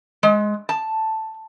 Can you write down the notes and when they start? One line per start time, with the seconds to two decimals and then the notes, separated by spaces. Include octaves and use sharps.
0.23 G#3
0.69 A5